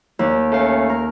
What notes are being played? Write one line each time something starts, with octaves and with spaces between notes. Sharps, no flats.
D#2
A3 C#4 F5
A#4